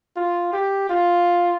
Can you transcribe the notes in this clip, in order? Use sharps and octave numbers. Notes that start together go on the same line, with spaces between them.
F4
G4
F4